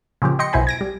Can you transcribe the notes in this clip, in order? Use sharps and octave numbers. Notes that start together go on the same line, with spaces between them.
A#2 C#3 F3 G4
D#5 G5 C6 A#6 C#7
B1 B2 E4 C5 G#5 B5
G#6 A#6 D7
G3